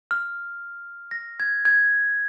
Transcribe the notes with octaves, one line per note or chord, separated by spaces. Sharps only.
F6
A#6
G#6
G#6